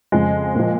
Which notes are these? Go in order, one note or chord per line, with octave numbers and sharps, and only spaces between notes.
F2 C#3 F3 G#3
A#2 F3